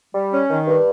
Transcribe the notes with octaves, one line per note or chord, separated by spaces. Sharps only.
G3
C#4
D#3
G2